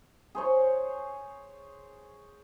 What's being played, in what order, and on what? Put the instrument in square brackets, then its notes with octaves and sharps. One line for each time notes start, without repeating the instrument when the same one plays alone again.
[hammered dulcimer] G#4 C5 C#5